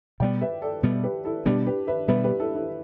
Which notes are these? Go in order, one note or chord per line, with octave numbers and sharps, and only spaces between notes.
B2 G3 B3 D5 G5
B4 E5
A4 D5
B2 G3 B3
G4 B4
E4 A4
B2 G3 B3 D4 G4
G4 B4
B4 E5
B2 G3 B3 B4 E5
G4 B4
E4 A4
E4 A4